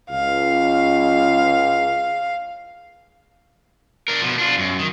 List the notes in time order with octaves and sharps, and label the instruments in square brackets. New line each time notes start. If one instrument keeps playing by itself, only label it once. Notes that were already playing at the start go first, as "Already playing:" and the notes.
[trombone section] C#2 [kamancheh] F5
[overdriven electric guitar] D4 A#4
B2 F3
D4 F4
F#2
D#3